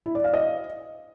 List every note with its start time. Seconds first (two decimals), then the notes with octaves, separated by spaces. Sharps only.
0.06 E4
0.15 D5
0.24 F5
0.33 D#5